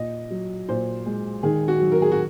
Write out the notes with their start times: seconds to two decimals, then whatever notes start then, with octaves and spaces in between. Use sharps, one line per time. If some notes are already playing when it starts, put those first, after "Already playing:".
Already playing: A#2 D#5
0.30 F#3
0.68 A#2 C5
1.06 G#3
1.43 D#3 G#4
1.68 F#4
1.80 F#3
1.92 A#4
2.02 G#4
2.12 F#4